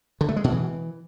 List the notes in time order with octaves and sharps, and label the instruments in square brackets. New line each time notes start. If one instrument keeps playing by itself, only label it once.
[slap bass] D3
A3
G#3
B2
E3